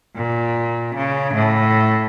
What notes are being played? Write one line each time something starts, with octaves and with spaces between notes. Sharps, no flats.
A#2
C#3
A2